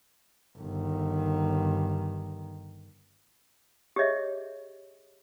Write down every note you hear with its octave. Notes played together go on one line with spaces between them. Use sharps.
G1 D#3
G4 G#4 C#5 D#5 E5